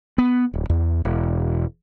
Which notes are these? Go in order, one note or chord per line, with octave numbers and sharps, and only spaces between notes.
B3
D1
E2
E1